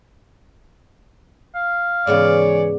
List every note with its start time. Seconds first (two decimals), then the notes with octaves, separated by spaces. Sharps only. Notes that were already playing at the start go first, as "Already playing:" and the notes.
1.55 F5
2.07 G#2 C#3 E3 B3 C#5 D5